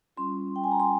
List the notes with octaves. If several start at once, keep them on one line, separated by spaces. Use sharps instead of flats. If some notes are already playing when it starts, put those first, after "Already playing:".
G3 C#4 F4 C6
G5
G#5
A#5
C6